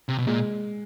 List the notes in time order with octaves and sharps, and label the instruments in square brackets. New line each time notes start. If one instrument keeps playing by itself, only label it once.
[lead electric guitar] C3
B2
[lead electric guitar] A#2 [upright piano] G#3